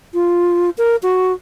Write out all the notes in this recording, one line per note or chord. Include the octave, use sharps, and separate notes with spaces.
F4
A#4
F#4